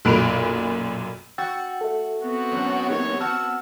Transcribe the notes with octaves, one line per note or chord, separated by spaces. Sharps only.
B1 F#2 A#2 B5 D7 F7
F#4 G5 E6 A6
A4 E5
B3 C4 F#4
F#2 A2
A#3 D#4 G4 C#5
F#4 A5 E6 F6